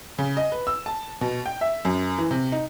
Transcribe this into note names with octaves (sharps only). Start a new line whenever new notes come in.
C#3
D#5
B4
E6
A5
B2
G5
E5
F#2
E3
C3
D#4